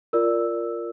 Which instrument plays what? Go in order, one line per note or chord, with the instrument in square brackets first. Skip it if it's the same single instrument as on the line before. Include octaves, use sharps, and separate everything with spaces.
[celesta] F4 A#4 D5 E6